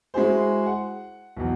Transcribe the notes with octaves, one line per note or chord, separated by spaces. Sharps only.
G#3 E4 F#4 G#4 C5
F#5
B1 E2